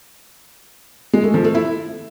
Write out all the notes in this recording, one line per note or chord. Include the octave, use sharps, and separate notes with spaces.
G#3
A3
F3
A3
E4